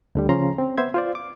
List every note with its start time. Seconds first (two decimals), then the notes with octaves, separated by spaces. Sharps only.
0.15 D2 D3 G3
0.29 C#3 F3 C#4 A#5 C6
0.58 C4
0.78 B3 C5 E5 G#6
0.94 F4 C5 D5
1.15 D6